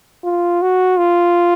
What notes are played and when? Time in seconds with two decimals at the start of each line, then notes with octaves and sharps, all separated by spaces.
0.24 F4
0.62 F#4
0.99 F4